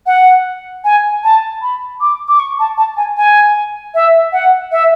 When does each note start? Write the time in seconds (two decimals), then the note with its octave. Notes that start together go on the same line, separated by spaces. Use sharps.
0.06 F#5
0.84 G#5
1.24 A5
1.62 B5
2.01 D6
2.28 D6
2.39 C#6
2.59 A5
2.78 A5
2.97 G#5
3.17 G#5
3.95 E5
4.32 F#5
4.72 E5